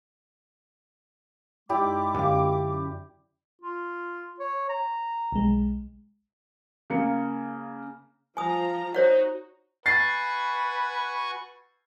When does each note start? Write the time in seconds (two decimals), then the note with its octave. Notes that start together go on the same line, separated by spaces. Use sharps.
1.69 F#2 G#3 D#4 E4 G4 D5 D6 E6
2.15 F#2 D3 G4 F5
3.62 F4
4.40 C#5
4.69 A#5
5.32 B1 G#3
6.90 C#3 A#3 C#7
8.37 F3 G#5 A#5 D#6
8.95 D#4 F#4 C5 C#5 F#5
9.86 F#4 B4 G#5 C#6 A6 C7